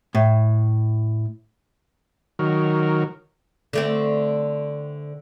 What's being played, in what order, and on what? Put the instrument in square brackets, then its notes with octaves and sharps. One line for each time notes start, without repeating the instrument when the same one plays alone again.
[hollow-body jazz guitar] A2
[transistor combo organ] D#3 F#3 A#4
[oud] D3 A3 C4